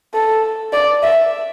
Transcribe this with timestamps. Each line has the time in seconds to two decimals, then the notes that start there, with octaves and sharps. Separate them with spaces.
0.14 A4
0.73 D5
1.03 E5